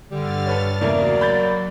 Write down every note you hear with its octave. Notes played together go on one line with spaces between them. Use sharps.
G2 D3 G3 F6 A6
A4 B4 C#5
E2 C#3 F#3 A3 A#3 D5
B5 G6 A6